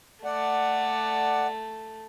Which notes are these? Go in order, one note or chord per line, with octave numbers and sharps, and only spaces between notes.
A3 D5 F#5